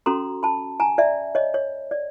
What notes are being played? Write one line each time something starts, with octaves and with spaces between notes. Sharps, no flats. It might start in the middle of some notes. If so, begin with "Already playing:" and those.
C#4 F#4 A4 A#5 C6
A5 B5
G#5 A#5
D5 E5
C#5 D#5
C#5
D5